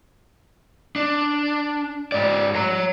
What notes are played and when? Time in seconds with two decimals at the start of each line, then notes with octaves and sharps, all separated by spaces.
0.96 D4
2.12 G#2 D5
2.55 C#5 A#5